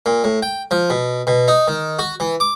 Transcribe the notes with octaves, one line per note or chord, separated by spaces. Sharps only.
A#2
A2
G5
F3
B2
B2
D#4
D#3
F#4
E3
D6